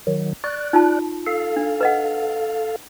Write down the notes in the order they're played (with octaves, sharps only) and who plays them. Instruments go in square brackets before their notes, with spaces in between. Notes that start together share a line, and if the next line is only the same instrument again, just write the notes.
[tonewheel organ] D#3 F#3
[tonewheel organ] D5 F#6 [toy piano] C#6
[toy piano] D#4 F4 A5
[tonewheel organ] A4 F5
[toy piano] D4
B4 D#5 F#5